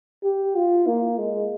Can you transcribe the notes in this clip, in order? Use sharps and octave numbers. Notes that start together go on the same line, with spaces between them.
G4
F4
A#3
G#3